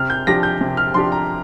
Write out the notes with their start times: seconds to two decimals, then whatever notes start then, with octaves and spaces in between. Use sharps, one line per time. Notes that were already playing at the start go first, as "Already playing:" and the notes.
Already playing: C3 F6
0.10 G6
0.27 F3 D4 G4 A#6
0.43 G6
0.61 C3
0.77 F6
0.94 F3 D4 G4 C6
1.12 A#5